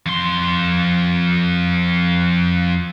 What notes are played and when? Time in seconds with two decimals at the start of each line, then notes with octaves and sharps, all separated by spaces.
0.06 F2 C6